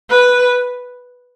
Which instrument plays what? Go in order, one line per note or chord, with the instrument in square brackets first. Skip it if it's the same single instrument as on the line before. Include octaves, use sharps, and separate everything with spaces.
[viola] B4